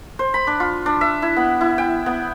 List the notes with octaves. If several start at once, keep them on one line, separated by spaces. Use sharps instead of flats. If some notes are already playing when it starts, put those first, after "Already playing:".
C5
B5
D4
F4
D4
E5
E4
B3
E4
G5
B3